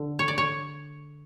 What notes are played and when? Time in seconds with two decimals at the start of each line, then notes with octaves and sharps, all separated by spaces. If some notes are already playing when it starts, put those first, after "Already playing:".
Already playing: D3
0.19 C#5
0.28 D5
0.38 C#5